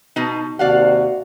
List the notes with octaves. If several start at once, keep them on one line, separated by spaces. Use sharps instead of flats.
B2 D#4
D#2 C3 F#4 D5 F5 F#5